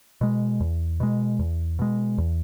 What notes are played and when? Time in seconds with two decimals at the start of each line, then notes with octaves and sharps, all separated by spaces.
0.21 B2 G#3
0.60 E2
1.00 B2 G#3
1.39 E2
1.79 B2 G#3
2.18 E2